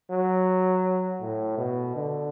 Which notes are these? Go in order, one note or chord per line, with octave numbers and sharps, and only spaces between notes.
F#3
A2
B2
D3